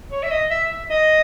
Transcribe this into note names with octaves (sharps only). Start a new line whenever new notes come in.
C#5
E5
D#5
E5
E5
D#5